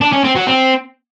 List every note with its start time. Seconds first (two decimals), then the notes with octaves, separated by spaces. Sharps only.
0.01 D4
0.13 C#4
0.24 C4
0.36 F#3
0.47 C4